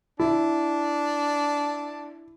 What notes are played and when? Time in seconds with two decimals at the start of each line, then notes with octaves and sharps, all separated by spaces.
0.20 D4 E4